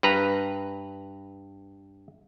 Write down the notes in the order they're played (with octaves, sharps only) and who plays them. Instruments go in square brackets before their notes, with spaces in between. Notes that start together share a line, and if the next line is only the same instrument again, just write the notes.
[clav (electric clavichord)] G2 B4 A#5